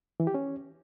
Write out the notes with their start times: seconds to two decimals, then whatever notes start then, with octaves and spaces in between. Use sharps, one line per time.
0.20 E3
0.27 G4
0.34 C#4